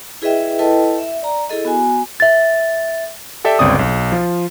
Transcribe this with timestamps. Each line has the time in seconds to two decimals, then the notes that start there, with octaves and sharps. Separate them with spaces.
0.22 E4 G#4 B4 D#5 E5 G5
0.59 E4 A4 B4 D#5 G5 A5
0.98 E5
1.22 D5 A#5
1.49 E4 G#4 A4 D#5
1.65 B3 F#4 G#5
2.20 E5 A6
3.44 G4 A4 D5 E5 G5
3.59 G1 C#2 C4 D5 D#6
3.79 B1
4.12 F3 F4